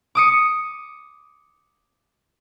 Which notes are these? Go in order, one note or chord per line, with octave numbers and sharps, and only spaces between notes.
D6 D#6 C#7